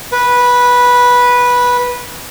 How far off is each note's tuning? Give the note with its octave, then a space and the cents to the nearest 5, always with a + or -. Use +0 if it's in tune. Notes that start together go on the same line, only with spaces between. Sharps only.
B4 -10